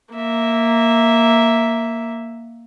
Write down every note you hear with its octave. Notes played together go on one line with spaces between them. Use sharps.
A#3 E5